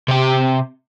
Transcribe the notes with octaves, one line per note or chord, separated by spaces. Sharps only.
C3 G4